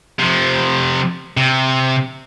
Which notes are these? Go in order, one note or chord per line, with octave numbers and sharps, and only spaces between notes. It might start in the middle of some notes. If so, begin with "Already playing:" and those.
C3 F3
C3